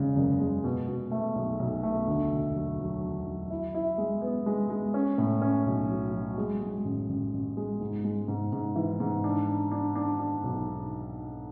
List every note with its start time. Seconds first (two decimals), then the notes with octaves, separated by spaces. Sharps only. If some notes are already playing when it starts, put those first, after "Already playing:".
Already playing: E2 C#3 G#3
0.16 F#1
0.40 G#3
0.64 B2
0.88 B2
1.12 A3
1.36 B1
1.59 B1
1.83 A3
2.07 D2
2.31 E1
2.55 F#3
2.80 F#3
3.03 E1
3.27 F#3
3.50 E4
3.74 E4
3.98 G#3
4.22 B3
4.46 G#3
4.70 G#3
4.94 C#4
5.18 A2
5.42 C#4
5.66 B1
5.89 F#3
6.13 F#3
6.38 G#3
6.61 G#3
6.85 A1
7.09 A1
7.33 A1
7.57 G#3
7.81 G#2
8.04 G#3
8.28 G#2
8.53 G#2
8.76 E3
9.00 G#2
9.24 D4
9.48 D4
9.71 D4
9.95 D4
10.19 D4
10.44 B1